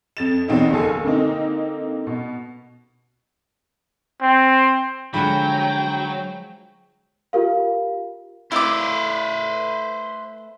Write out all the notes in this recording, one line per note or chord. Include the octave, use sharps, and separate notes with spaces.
F2 A6 E7
E2 B2 C4 C#4 D#4
F#1 D#2 A4 G#5
D3 A#3 C4 D#4
B2
C4
D3 F3 F#3 G#3 F#5 G5 B5
F4 G4 A#4 F5
A3 E4 B4 C5 E5 F5 D6